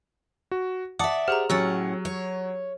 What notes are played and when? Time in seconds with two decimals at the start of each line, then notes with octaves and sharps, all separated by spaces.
0.51 F#4
0.99 D5 E5 F#5 A5 D6 D#6 C#7
1.28 G4 G#4 C5 F#5 A#5 F6
1.50 A2 F#3 C#4 F#5 E6 A6
2.05 C#5